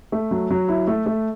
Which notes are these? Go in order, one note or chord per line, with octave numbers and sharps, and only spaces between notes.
A3
F#3
F#3
E4
A3
A3